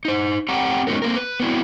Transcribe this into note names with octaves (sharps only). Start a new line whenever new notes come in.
D#4 C5
C4 G4 F#5 G5 A#5
G#3 B3 C#4 D#4 F#4 A#4
A#3 C4 A#4
B4
B3 C4 E4 F#4